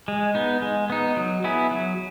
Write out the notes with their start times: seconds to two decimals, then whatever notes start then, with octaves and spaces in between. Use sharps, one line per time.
0.08 G#3
0.35 B3 D#4
0.62 G#3
0.90 B3 D#4
1.17 F#3
1.44 B3 E4 G#4
1.71 F#3